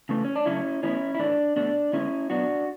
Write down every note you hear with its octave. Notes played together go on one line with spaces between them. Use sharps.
C#3 E3 A3
C#4
D4
C#3 F#3 A3 C#4 E4
A2 E3 B3 C#4 E4
E4
A2 E3 A3 D4
B2 A3 D4
D3 G#3 B3 C#4 E4
B2 F#3 B3 D4 F#4